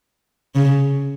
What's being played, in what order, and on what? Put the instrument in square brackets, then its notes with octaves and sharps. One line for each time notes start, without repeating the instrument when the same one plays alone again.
[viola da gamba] C#3